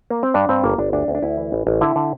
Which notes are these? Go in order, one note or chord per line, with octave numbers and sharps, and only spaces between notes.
A#3
C4
G2 D4
G2 C4
G1 A#3
G1 D4
D2 D4
D2
D4
D2 E4
E3
A1
A1
D3 E4
D3